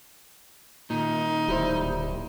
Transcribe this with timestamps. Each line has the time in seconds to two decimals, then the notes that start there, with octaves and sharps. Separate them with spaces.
0.90 A#2 D#3 D#4
1.48 D1 G3 E4 C5